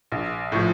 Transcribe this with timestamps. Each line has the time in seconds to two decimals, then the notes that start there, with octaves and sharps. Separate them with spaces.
0.12 A#1
0.52 A2 F3